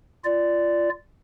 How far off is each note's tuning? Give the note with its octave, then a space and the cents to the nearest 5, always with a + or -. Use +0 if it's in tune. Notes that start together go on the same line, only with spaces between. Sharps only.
F4 -20 D5 +0